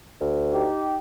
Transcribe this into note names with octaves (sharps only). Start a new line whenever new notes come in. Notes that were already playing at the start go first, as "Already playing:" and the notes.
D2
D#4 G4